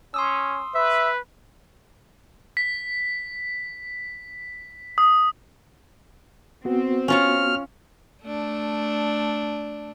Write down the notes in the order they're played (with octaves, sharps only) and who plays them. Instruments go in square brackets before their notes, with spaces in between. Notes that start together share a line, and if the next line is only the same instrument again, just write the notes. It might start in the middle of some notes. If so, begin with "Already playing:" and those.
[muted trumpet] C#4 [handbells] C6 D#6 E6
[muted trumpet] B4 [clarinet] E5
[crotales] B6
D#6
[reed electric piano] B3 F#4 [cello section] C4
[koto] C#4 F4 C#5 [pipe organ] F6
[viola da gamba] A3 D4